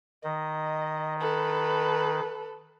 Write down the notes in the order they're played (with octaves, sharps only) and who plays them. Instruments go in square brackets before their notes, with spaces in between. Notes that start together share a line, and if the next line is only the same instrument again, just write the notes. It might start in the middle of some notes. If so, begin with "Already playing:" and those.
[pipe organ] D#3 [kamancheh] D#5
[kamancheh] A4 B4